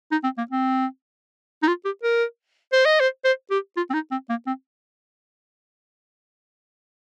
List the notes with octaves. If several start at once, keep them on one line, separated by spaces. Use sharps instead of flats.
D#4
C4
A#3
C4
D#4
F4
G4
A#4
C5
D#5
C5
C5
G4
F4
C4
D#4
C4
A#3
C4